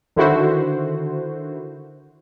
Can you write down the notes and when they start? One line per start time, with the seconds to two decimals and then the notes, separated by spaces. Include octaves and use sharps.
0.16 D3 D#3 E4 F#4 C5